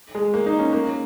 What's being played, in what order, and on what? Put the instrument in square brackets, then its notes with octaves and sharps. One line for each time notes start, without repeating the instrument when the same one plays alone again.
[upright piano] G#3
A#3
D#4
C#4
A#3